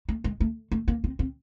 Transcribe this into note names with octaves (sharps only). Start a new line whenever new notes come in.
A3
G#3
A3
A3
A#3
C4
C4